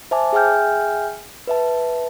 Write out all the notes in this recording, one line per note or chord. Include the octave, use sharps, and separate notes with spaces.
C5 E5 G#5 A5 D6
G#4 E5 G5 G#5 F6 G6
B4 E5 A5